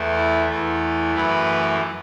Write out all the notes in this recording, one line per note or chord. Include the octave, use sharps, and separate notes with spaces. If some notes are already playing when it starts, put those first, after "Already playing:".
Already playing: E2 E3 A3
E4
E2 E3 A3
F#2 E3 A3 B4